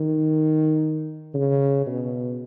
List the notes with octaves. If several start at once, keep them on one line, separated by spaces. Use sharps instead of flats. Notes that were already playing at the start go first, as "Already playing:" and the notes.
Already playing: D#3
C#3
B2